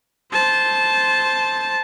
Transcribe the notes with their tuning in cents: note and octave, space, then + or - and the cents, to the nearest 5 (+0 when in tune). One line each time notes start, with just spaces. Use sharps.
C5 +0 A5 -15